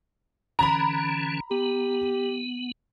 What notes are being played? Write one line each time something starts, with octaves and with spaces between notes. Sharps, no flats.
D3 E3 C#4 A#5 B5
B3 G4